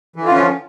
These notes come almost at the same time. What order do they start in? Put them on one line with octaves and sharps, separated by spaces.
E3 D3 F4 C#4 F3